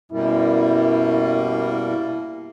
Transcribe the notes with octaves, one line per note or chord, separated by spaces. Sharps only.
F#2 B2 G3 A#3 E4